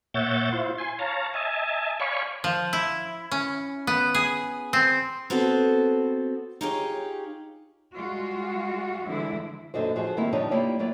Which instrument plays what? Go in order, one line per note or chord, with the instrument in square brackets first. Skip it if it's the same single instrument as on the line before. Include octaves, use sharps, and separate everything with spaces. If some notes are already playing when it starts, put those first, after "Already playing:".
[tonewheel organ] A#2 C#5 E5 F#5 G6 A6
E4 F4 C5
G#5 C6
C#5 F5 A5 A#5
D#5 E5 G#5 A5
C#5 D5 F5 G#5 B5 C#6
[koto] F3
E4
C#4
B3
G#4
C4
[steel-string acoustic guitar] B3 C4 F#4 A4
D#4 F4 G4 G#4 C#5
[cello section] G3 G#3 F4 F#4
D3 E3 F3 G#3 E4
[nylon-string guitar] F#2 A#2 D3 D#4 F#4 C5
F3 F#4 G#4 C5
D#3 G3 A#3 C4 E4 F#4
C#3 F3 G3 D4 D#4 C#5
A#3 E4 F4 G4 C#5 D5
F#3 A#3 E4 D5